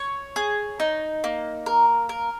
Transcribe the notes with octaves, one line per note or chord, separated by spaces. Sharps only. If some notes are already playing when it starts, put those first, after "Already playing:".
Already playing: C#5
G#4
D#4
A#3
A#4
A#4